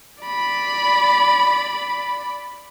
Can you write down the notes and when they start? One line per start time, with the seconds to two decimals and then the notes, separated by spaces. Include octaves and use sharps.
0.23 D5 B5